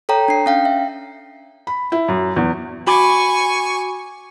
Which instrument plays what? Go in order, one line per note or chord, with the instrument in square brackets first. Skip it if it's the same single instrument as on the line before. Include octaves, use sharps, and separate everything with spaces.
[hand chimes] A4 C#5 G5 A#5
D4 C7
C#4 F5 G5
E5
[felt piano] B5
E4
F#2
E2
[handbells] F#4 B5 D6 [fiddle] G#5 C#6